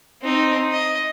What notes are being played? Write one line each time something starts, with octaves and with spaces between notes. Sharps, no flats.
C4 D#4
D#5